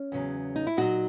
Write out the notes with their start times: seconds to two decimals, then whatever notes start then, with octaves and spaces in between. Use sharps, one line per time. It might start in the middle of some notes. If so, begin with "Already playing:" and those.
Already playing: C#4
0.12 E2 C#3 F#3
0.56 D#4
0.67 E4
0.77 A#2 F#3 D#4 F#4